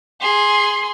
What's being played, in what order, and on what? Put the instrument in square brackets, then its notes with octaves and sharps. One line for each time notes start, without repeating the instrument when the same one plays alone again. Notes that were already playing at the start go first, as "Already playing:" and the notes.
[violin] G#4 C6